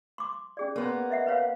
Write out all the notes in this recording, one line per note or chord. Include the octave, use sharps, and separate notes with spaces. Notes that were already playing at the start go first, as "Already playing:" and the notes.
C6 D6
C#4 G#4 D5
A#3 B3 C#5 C6
D#5 E5 F#5
B4 C#5 F5